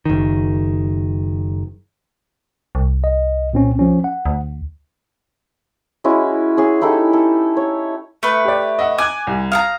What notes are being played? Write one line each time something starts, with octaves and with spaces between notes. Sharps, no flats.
F#1 D#3
C2
D#5
A#2 C4 C#4
F3 C#4
F#5
D2
G#3 C#4 E4 F#4
C#4 G#4
D#4 E4 G4 A4
A4
C#5
A3 B4
G4 D5
D#5 E5 F#5
G#5 D6 F#6 G#6
C2
F5 F#5 A#5 D#6